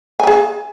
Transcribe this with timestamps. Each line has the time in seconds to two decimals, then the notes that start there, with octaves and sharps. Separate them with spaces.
0.20 G#5
0.23 E5
0.27 G#4